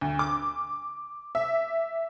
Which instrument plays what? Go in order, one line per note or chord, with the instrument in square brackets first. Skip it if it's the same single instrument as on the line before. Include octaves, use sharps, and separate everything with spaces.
[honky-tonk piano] D2
D6
E5